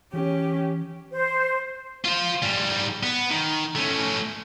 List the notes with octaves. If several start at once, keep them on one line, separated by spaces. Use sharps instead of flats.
E3 C#4 G4
C5
F4 C5
G#2 G3
B3
D#3
A3 C#4